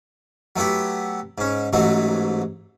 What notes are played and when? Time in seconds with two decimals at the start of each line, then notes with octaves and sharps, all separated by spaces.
0.56 F#3 A3 B3 E4 G4
1.38 G#2 C#4
1.73 A1 G#2 E3 F#3 G#3 A3